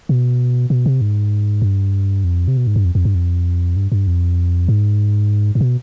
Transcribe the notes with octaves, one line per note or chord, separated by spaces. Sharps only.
B2
B2
C3
G#2
G2
F2
C3
B2
G#2
G2
F2
F2
G2
F2
G2
G2
F2
G#2
G#2
B2